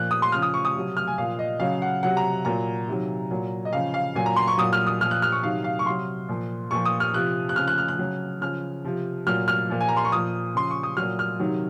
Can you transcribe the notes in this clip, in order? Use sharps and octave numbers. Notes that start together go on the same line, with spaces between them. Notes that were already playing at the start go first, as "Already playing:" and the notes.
Already playing: A#2 F3 F#6
D#6
C6
C#3 F3 F6
D#6
C#6
D#6
C3 F#3
F6
G#5
A#2 F3 F5
D#5
C#3 F#3 F5
F#5
C3 F#3 F#5
A#5
A#2 F#3 A#5
C3 D#3 F#3
A#2 F#3
D#5
C#3 F3 F5
F5
A#2 F#3 G#5
A#5
C6
C#6
A#2 F#3 D#6
F6
D#6
A#2 F3 F6
F#6
F6
C#6
C3 D#3 F#3 F5
F5
C#6
C3 F#3 C6
A#2 F3
A#2 F3 C#6
D#6
F6
C3 F3 F#6
F#6
C#3 F3 F6
F#6
F6
F#6
C#3 F#3
C#3 F3 F6
C3 F3
A#2 F#3 F6
F6
A#2 F3
G#5
A#5
C6
C#6
A#2 F3 D#6
C#3 F3 C6
C#6
D#6
A#2 F#3 F6
F6
C3 D#3 F#3